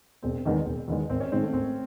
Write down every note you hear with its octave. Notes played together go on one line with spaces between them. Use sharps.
E1 C4
E2 D#3 G#3
E1
E2 D#3 G#3
G#1 C4
C#4
G#2 D#3 G#3 C4 D#4
A3
G#1 C4